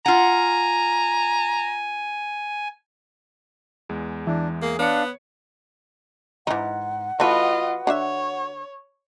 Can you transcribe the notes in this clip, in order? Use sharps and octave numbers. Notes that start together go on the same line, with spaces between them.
F4 F#5 G#5 A#5
E2 G#3
E3 D4
A#3 G#4
B3 D4 C#5 F5 C#7
F2 G#2 E3 D#4 F#5
E3 A3 F4 F#4 A4 B4 D#5
D3 D4 C#5 E5